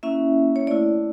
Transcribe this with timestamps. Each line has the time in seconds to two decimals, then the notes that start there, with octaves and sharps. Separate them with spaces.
0.03 A#3 C#4 E4 E5
0.56 C#5
0.67 A3 E4 D5